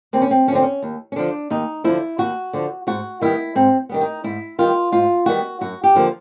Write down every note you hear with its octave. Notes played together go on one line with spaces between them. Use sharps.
D#2 C4
C#4
C4
D3 F3 C4 C#4
C#4
D#2
C#4
D3 F3 D4
D#2 D#4
D3 F3 E4
D#2 F#4
D3 F3
G#2 F#4
D#3 G3 B3 E4
G#2 C4
D#3 G3 B3
D#4
G#2 E4
D#3 G3 B3 F4
G#2 F4
D#3 G3 B3 F#4
F#2 F#4
G4
D3 F3 A#3